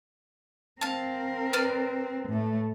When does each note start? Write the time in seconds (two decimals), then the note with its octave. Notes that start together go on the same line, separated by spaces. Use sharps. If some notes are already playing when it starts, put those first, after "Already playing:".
0.81 C4 A#4 F5 A5
1.53 B4 D5 F6
2.29 A2 A3